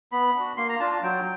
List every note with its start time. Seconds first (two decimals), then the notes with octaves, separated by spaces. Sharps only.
0.12 B3 B5
0.35 D4 F#4
0.57 A#3 C6
0.69 A#5
0.80 D4 F4 A5
0.91 A5
1.03 F#3 G5